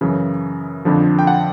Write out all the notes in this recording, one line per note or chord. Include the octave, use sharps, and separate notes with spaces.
F#2 C#3 E3
F2 D3 F3
G5
F#5